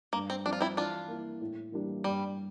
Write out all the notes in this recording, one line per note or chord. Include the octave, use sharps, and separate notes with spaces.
G2 A#3
C4
F3 C4 D4
F4
C4 E4
E3 D4 F4
A#3 E4
A2
E3 G3 A#3 D4
G2 G3